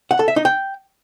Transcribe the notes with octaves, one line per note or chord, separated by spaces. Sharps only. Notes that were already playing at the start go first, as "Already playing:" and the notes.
F#5
A4
E5
D#4
G5